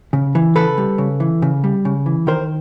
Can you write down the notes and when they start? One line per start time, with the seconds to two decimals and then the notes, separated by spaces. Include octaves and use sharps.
0.13 C#3
0.35 E3
0.55 C#3 A4 B4
0.78 G3
0.98 C#3
1.20 E3
1.42 C#3
1.64 G3
1.85 C#3
2.06 E3
2.27 D#3 A#4 C5